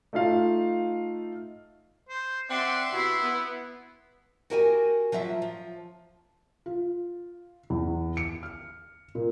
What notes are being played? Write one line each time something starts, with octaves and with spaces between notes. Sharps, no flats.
A3 D#4 F4 F5
C5
C4 D5 E5 F#5 C6
C3 B3 E4 F#4
B3
F#4 G4 A#4 C5 F#5 G#5
F3 F#3 F4 E5
F3
F4
E2
C#7
F6
A#2